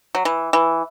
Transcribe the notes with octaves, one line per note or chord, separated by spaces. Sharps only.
F#3
E3
E3